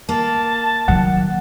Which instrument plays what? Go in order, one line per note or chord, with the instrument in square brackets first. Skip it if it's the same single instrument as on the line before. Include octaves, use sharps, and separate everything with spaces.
[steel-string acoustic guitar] A#3 [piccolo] A5
[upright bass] D#3 F#3 [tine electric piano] F#5